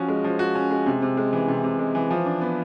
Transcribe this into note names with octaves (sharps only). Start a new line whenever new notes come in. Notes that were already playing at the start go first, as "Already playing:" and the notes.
Already playing: F3 C#4 F#4
G#3
F3
F#4
C#4
G#3
C3
C3
G#3
E3
C3
C3
G#3
E3
F3
D4
B3